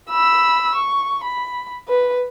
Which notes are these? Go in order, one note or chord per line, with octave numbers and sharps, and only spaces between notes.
B5 E6
C#6
B5
B4